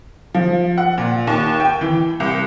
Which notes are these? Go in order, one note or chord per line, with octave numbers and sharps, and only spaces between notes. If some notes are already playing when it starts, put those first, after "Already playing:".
F3
F#5
A#2
D#2
G5
E3
C2